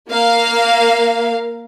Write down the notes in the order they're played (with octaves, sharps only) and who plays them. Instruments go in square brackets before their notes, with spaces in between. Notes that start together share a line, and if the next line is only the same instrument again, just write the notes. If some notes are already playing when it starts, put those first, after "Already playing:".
[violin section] A#3 F5